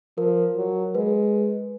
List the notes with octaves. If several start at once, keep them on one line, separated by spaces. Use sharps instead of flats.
F3 A#4
F#3
G#3 B4